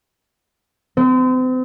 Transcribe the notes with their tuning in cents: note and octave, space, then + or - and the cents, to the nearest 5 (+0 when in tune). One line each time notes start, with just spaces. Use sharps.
C4 -40